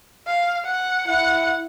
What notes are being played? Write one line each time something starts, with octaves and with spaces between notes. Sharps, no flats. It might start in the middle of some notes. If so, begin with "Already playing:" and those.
F5
F#5
E4 F#5